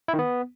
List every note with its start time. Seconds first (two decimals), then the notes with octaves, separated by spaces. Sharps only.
0.08 E4
0.14 D#3
0.19 B3